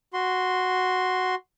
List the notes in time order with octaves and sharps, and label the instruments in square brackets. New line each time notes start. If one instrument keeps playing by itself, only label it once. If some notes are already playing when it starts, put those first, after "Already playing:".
[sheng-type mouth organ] F#4 C6